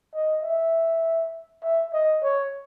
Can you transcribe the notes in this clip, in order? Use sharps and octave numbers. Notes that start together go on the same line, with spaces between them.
D#5
E5
E5
D#5
C#5